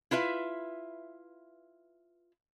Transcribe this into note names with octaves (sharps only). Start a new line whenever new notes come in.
E4 F4 B4 E5